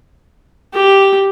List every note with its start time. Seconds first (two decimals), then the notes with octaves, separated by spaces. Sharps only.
0.74 G4